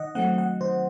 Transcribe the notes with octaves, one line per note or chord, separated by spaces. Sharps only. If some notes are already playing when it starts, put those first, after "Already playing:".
Already playing: D#3 D#5 F#5
F#3 A3 C4 F#5
F#5
D#3 C5